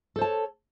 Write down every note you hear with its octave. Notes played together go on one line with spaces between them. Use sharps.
A4 C5 C#5 A5